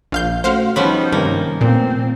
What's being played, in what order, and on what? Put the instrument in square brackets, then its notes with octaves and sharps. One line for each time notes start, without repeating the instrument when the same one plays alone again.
[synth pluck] A#1 F5 G6
[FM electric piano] A3 C#4 F#4 [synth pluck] C5 F5 F#5
[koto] F3 B3 C#4 [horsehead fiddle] G3 D#4 [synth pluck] B5 [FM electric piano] C6
[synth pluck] G2 [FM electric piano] C3 D#3 [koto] A#3
[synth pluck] A#2 [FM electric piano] A3 B3 [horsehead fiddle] C4